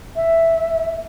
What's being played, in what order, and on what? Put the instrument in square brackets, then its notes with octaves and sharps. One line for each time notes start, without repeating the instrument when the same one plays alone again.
[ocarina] E5